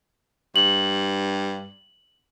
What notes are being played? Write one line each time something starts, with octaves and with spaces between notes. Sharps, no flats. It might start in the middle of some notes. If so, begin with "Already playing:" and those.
G2 F#7